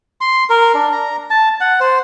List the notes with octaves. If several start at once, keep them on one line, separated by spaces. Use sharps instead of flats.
C6
A#4
D4
A#5
A5
F#5
C5